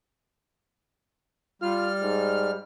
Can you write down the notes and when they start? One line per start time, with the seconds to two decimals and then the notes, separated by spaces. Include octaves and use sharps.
1.62 G3 F4 F6
2.02 G#2